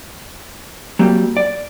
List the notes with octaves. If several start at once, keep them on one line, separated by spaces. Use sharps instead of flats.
F#3 G3 A#3 C4
D5